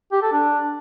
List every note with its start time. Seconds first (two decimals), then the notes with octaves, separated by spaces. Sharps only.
0.12 G4
0.22 A4
0.32 D4